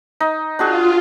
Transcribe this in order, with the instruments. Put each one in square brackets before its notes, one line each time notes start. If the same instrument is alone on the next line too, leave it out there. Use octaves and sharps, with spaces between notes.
[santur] D#4
[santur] D4 F#4 G#4 [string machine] F4